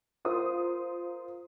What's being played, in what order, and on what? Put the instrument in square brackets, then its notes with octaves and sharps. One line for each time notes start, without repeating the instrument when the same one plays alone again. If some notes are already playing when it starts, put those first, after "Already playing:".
[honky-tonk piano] F4 A#4 C5 D#6